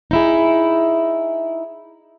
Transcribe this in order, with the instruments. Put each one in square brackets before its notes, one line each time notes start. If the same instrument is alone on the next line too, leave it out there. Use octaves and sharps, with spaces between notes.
[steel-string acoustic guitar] D#4 E4 G#4